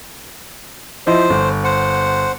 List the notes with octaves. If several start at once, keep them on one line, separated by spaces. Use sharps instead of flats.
F3 E4 C5 D#5
G1
C5 F#5